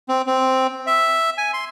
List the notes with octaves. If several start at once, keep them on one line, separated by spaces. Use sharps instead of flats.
C4
C4
E5
G#5
C6